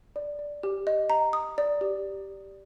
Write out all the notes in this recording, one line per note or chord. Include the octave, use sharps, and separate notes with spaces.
D5
D5
G4
D#5
A#5
D#6
D5
G4